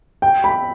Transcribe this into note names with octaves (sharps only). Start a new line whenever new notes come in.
G5
B5